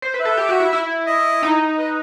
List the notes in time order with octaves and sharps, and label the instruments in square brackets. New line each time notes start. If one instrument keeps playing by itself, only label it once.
[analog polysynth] C5
B4
[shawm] E5
[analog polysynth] A4
G4
F#4
E4
E4
[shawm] D#5
[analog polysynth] D#4
[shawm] B4